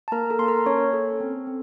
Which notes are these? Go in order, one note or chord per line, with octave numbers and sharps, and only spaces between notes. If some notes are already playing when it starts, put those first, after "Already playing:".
A5
A#3 A#4 A#5
A4 A5
A#3 C6
A#4 A#5
C#4 C#5 C#6
A4
C4
C4